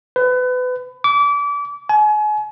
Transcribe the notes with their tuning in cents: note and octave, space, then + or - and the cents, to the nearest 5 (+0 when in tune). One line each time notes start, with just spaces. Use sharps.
B4 +30
D6 -30
G#5 +35